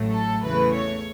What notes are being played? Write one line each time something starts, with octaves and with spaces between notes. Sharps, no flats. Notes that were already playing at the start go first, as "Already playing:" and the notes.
Already playing: A1 A2 F#3 A3
A4
E2 C#3 E3 A3 B4
C#5